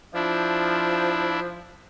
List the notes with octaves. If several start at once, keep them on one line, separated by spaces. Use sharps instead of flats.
F3 D4 E4